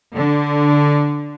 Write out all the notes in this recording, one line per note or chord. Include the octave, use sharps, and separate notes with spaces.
D3